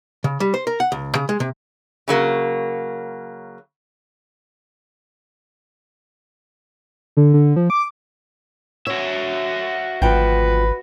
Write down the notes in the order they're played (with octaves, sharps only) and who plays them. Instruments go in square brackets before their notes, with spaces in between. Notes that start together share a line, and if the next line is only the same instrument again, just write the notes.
[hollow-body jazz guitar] C#3
G3
C5
A#4
F#5
C#2
C#3
G#3
C3
[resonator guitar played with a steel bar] C#3 F#3 A#3
[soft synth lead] D3
D3
F3
D6
[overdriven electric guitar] F#4 E5 [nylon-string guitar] C#5
[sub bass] G#1 [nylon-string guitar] D2 F3 G5 [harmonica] B4